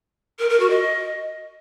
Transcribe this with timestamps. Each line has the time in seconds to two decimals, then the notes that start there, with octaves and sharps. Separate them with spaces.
0.39 A#4
0.49 A#4
0.60 F#4
0.70 D#5